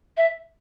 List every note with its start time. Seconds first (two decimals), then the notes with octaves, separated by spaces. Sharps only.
0.17 E5